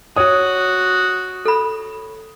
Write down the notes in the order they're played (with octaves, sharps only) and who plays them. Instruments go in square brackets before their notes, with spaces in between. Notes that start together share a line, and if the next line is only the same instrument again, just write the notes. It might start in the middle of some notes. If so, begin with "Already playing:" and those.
[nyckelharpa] F#4 [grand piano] C#5 D#6
[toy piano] A4 B5